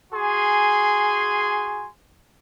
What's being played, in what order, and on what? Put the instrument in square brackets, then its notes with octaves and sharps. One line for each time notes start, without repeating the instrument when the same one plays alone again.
[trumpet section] F#4 G#4 G#5 C6